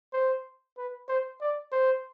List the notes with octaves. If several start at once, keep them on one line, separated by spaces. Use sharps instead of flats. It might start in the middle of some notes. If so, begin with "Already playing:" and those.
C5
B4
C5
D5
C5